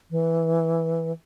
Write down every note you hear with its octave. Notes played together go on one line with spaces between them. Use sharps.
E3